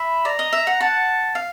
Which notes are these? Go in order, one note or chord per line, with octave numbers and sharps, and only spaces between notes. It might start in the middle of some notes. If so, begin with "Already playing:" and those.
Already playing: E5 B5
D5 A#5
D#5
E5
F#5
F#5 A5
F5